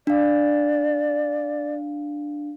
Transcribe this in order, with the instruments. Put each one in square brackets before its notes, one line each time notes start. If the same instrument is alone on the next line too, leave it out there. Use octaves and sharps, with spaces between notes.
[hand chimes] D4 F5 [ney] D5